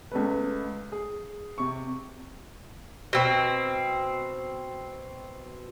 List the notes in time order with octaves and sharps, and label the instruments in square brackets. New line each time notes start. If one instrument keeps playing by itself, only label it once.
[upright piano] C#2 A3 B4
G#4
C3 C#6
[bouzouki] B2 C4